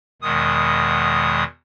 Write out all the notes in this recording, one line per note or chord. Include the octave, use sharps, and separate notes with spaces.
E2 B2 D#3 G#3 D#6